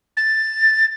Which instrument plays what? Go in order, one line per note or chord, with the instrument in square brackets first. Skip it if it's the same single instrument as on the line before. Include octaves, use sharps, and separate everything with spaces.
[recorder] A6